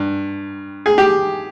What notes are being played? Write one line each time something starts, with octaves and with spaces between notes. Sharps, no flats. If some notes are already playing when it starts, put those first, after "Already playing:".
Already playing: G2
G#4
G4